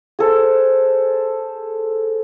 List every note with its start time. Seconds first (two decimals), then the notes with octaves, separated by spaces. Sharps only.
0.19 G#4 A4 C5